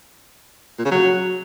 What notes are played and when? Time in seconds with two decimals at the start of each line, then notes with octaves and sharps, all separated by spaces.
0.79 A#2
0.85 C#3
0.91 F#3